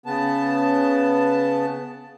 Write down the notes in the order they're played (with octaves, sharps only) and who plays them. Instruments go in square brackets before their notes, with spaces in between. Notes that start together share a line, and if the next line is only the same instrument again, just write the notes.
[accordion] C#3 B3 A5